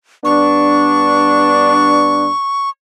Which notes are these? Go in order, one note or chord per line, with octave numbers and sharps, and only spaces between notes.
G2 B3 D4 C#6